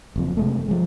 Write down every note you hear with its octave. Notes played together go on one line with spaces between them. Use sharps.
F#1 F2
C3 G#3 A3
F3 G#3